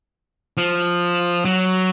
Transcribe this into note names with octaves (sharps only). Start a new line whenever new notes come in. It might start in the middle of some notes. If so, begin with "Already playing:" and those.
F3
F#3